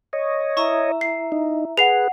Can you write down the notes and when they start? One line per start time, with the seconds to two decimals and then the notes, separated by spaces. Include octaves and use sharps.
0.13 C#5 D#5
0.57 E4 E5 A#5 C#6
1.01 C7
1.32 D#4
1.77 G#4 B4 F#5 C7 F7